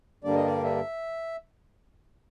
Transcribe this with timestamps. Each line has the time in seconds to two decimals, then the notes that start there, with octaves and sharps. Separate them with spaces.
0.24 G2 D3 G3 A#3 D4 D5
0.35 D#5
0.46 D5
0.64 E5